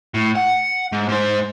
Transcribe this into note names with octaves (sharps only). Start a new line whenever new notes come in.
A2
F#5
G#2
G#2 C5